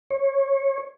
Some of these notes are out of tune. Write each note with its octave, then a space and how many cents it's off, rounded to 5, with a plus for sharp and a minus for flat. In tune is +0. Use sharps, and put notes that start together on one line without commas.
C#5 -20